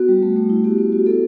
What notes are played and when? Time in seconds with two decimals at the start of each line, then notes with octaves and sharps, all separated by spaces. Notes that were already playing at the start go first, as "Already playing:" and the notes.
Already playing: B3 F#4
0.08 G3
0.23 A3
0.36 A3
0.50 E4
0.64 B3 G4
0.78 B3
0.92 F#4
1.06 B3 A4